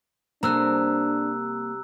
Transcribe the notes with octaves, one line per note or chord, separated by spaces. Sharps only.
C3 G3 A#3 D4 A4 A#5 E6 F#6